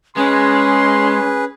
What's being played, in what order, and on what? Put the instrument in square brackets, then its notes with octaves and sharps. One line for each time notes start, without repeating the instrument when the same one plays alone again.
[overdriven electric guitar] G#3 [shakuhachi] C#4 [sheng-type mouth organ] G#4 B4 [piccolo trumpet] C6